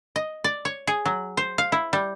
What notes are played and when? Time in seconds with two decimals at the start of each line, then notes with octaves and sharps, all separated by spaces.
0.16 D#5
0.44 D5
0.65 C#5
0.87 G#4
1.06 F#3
1.37 C5
1.58 F5
1.72 E4
1.93 G3